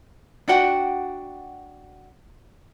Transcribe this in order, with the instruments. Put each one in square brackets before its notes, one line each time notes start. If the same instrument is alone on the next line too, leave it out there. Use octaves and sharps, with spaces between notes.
[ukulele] D4 F#4 F#5 G5